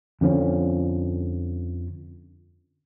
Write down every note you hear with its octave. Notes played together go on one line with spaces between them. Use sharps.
F2 D3 F3 C#4